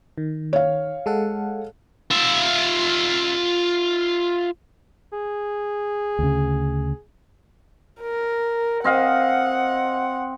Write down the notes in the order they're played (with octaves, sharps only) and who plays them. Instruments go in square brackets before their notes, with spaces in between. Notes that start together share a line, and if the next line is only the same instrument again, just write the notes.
[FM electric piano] D#3
[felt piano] C#5 F5
[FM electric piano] G#3 A4 F#5
[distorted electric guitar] F4 E5
[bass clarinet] G#4
[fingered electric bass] D2 C#3
[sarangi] A#4
[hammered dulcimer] C4 D#5 F5 [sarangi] F#5